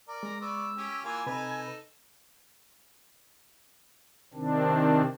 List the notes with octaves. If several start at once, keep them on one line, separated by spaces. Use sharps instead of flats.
A#4 D5
G#3 A#5
B3 D5 C#6 E6
C#4 G4
E3 A#3 F4 G#5
C3 D#4 A4 B4 B5
C3 D#3 C4 D4